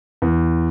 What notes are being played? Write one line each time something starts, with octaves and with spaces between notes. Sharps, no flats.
E2